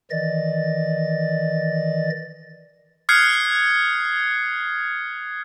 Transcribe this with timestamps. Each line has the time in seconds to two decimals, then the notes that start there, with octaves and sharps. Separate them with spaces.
0.11 D#3 E3 D5 D#5 A6
3.09 D#6 F6 F#6 G#6 C7 C#7